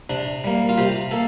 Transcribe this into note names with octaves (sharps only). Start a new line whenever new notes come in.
C3 D4
G3 A#3
F4
C3 G4
A#3 A4